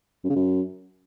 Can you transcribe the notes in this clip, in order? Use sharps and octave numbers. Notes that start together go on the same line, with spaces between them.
F#2
C#3
F#2